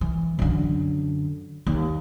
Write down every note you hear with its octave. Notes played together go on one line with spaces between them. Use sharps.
E3
F#2 D3
D#2